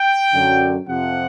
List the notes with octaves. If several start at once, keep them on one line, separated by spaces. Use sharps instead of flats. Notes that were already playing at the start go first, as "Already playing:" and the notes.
Already playing: G5
F#2 D3 F#3
F2 C3 F3 F#5